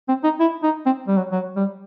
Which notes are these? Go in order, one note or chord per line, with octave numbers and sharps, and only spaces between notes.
C4
D#4
E4
D#4
C4
G3
F#3
F#3
G3